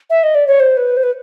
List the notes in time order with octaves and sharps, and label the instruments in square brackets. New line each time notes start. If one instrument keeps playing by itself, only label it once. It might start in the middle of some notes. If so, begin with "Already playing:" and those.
[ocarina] E5
D#5
D5
C#5
C5
B4
C5
B4